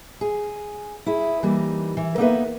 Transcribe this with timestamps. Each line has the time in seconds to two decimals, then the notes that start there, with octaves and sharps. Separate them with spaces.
0.21 G#4
1.06 E4 G#4
1.43 E3 G3 A#3 D#4
1.97 E3
2.18 A#3 B3 D#4 A4 B4 E5